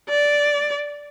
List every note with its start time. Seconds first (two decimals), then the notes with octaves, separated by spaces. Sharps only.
0.10 D5